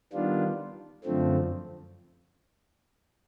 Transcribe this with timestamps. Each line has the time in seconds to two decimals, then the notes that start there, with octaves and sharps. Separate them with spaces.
0.13 D#3 G3 B3 D4 F4
1.04 F#2 D3 F3 A3 C4